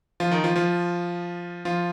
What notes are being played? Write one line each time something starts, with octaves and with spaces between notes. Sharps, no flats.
F3 F4
D#3 D#4
F3 F4
F3 F4
F3 F4